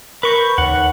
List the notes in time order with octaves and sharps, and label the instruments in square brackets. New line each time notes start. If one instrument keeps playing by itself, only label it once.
[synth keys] A#4 G6 [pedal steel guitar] B4 C#6
[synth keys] D#2 C#3 [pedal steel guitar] F#5